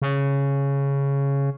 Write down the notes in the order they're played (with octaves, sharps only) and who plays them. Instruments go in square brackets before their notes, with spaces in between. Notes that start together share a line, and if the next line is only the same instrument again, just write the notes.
[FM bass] C#3